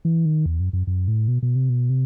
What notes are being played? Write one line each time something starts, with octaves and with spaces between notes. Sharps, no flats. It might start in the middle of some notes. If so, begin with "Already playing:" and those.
E3
D#3
E2
F#2
F#2
F#2
A2
B2
B2
C3
B2
C3